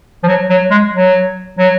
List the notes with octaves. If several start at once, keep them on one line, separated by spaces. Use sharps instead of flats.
F3
F#3
F#3
G#3
F#3
F#3